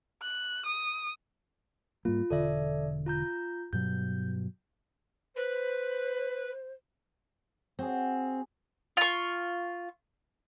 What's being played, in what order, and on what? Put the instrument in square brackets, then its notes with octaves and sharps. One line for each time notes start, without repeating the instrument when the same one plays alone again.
[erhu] F#6
D#6
[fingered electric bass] G#2 G3 A#3 [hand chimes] F4
[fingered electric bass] E1 D3 [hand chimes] A4 D5 E5
[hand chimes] F4 A#5 G6
[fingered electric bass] G2 B2 F#3 [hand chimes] G6
[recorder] B4 [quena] C5
[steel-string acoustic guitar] C4 [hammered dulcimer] F#4 G#4
[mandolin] F4 C#6